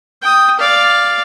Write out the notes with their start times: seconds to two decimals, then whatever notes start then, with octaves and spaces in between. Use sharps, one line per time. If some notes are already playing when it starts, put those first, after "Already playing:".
0.22 G5 D#6
0.59 D5 F5